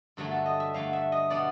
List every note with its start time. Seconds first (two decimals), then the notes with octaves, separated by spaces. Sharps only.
0.17 G2 D3 F#3 A3 A#4
0.31 A4
0.46 D#5
0.60 E5
0.74 G2 D3 F#3 A3 F5
0.93 E5
1.12 D#5
1.30 B2 G3 B3 D4 D5